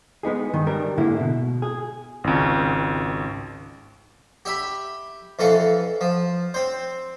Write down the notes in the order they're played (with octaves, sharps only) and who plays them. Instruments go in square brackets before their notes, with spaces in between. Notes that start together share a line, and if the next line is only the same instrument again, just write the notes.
[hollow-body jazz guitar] G#3 B3 D#4 G#4
G2 D#3
G3 D4 A#4
G#2 D3 A#3 E4
B2
G#4
[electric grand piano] G#1 C#2
[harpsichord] G4 E5 B5
F2 E3 A4 F5
F3
C4 C5